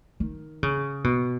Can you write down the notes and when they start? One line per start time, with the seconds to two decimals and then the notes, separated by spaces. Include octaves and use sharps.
0.20 D#3
0.63 C#3
1.04 B2